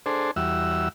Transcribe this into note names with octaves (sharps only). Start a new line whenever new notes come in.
D4 G#4 A4 C5
E2 G3 F#4 E5 E6